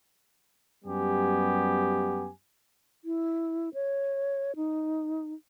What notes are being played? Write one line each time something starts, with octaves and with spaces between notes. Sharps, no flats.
F#2 G3 B3 G4 G#5
E4
C#5
D#4